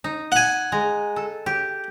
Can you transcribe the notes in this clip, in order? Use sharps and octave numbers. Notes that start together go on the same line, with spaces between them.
D#4
F#5 G#5
G#3 A#5
A4
G4